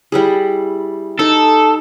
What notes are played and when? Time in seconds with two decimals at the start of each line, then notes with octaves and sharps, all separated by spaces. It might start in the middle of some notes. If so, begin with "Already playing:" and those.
0.12 G3 E4 G#4
1.19 D#4 A4